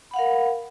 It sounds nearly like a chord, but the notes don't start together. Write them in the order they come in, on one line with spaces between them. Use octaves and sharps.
B5 F#5 F5 A#4